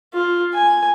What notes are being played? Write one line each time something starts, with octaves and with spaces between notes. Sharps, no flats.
F4
G#5